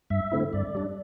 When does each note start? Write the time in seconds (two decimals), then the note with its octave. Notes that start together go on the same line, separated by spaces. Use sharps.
0.10 G2 E5
0.32 D3 A3 C4 E4
0.53 G2 D5
0.75 G3 D4